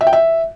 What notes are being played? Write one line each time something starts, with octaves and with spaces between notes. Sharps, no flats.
E5
G5
E5